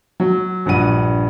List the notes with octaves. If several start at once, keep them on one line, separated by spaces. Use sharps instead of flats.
F#3
A#1 G2 F#5 D#7